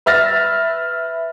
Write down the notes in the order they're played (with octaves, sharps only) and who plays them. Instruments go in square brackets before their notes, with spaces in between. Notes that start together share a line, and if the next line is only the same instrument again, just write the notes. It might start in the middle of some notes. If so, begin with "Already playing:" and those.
[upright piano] B4 E5 F6 A6 A#6